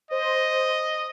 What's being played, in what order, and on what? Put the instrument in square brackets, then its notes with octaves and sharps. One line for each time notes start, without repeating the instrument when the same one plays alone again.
[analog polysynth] C5 [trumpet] D#5